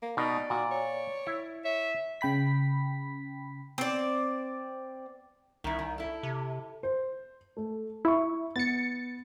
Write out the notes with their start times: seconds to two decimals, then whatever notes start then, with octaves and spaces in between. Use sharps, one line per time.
0.03 A#3
0.17 B2 D#4 D5
0.50 A#2 F#4
0.72 C#5
1.27 E4
1.65 C#5 E5
2.21 C#3 G5 B5 B6
3.78 C4 D5
5.64 C2 D#3 E4
5.79 D#3
5.98 E4 A4
6.23 C3
6.83 C5
7.57 A3
8.05 E4 E5 C#6
8.56 B3 A6 C#7